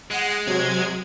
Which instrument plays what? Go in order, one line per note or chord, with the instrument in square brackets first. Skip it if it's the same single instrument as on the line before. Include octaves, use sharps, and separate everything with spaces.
[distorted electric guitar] G#3 [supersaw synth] F#5
[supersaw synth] C3 F#3 G#6